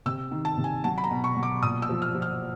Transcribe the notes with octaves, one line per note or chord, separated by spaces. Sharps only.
C3 E6
D#3
A5
C3
G#5
F#3 A5
B5
A#5
B2
C#6
F#3
D6
A#2 D#6
E6
F3
F6
F3
F6